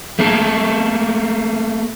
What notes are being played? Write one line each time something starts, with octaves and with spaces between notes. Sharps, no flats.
A3 A#3 A4